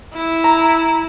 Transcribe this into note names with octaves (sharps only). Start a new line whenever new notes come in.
E4
A#5